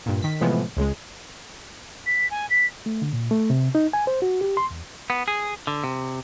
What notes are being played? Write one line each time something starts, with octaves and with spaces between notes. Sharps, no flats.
G2 A#2
D#3 B6
A2 C3 E3 F3 G#3 B3
C#2 C#3 G#3
B6
G#5
B6
A3
D3
A#2
A3
C3
D#4
G#5
C5
F#4
G4
C6
E2
B3
G#4
D3
C3